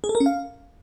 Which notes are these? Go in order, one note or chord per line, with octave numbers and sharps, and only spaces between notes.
G#4
A4
A#4
C#4
F5